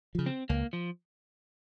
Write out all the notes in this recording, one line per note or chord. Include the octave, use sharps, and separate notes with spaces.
C#3 F3
C4
C#2 A#3
F3